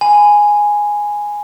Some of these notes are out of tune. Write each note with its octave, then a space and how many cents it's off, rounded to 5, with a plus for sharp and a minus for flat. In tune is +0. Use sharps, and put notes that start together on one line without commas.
G#5 +0 B5 +25